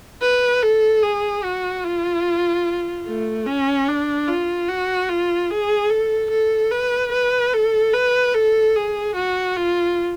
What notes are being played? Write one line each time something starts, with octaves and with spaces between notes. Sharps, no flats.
B4
A4
G#4
F#4
F4
A3
C#4
D4
F4
F#4
F4
G#4
A4
A4
B4
B4
A4
B4
A4
G#4
F#4
F4